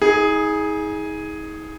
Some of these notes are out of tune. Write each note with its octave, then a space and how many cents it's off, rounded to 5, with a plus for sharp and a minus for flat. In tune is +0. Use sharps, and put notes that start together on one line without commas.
D#4 +40 G#4 +0